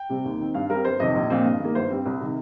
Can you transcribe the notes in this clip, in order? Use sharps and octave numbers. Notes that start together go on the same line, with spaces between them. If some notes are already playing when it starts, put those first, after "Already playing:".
Already playing: G5
C3 G3 C4
D#2
D#3 C4
G2 F5
G3 C4 A#4
G1 C5
F2 C3 D#3 D#5
A#1
A#2 F3 C4
G2
D#3 A#3
G1 C5
G2 G3 C4
C2
C3 D#3